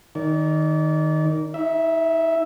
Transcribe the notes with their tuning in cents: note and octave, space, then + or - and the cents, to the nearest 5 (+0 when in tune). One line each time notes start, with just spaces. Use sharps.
D#3 +0 D5 -30
D#4 +40 E5 +0